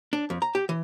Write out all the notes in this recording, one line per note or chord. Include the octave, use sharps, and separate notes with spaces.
D4
F2
A#5
G4
E3